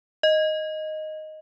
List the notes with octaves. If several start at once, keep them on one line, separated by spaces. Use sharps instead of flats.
D#5